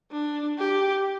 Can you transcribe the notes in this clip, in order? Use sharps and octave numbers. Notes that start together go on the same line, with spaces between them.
D4
G4